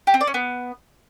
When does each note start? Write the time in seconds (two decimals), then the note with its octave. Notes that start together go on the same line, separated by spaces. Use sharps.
0.07 G4
0.14 C4
0.21 D5
0.27 C#4
0.34 B3